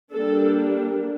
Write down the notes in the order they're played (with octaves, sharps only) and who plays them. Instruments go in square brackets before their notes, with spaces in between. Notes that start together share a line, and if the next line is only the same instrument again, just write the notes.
[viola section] G3 A#3 D4 A4